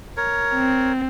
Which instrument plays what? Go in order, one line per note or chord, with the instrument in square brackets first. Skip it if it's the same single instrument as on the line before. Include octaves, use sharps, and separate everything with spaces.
[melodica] A#4 C#5
[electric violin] C4